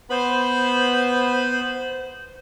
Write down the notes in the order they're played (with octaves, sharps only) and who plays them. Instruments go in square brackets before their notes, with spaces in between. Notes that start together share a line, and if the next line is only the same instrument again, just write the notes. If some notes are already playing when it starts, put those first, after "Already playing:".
[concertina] B3 B4 B5 [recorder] C5